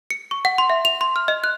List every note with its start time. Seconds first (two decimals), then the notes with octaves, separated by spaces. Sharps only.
0.10 C#7
0.31 C#6
0.45 F#5
0.58 C6
0.70 E5
0.85 F7
1.01 C6
1.16 F6
1.28 D#5
1.44 F#6